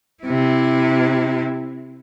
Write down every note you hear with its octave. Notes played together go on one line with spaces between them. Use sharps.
C3 E4